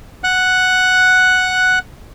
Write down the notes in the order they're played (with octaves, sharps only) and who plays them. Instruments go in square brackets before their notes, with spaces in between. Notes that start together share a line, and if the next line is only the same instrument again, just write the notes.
[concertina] F#5 F#6